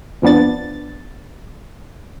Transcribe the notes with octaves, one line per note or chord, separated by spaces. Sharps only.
F2 F3 B3 D4 A6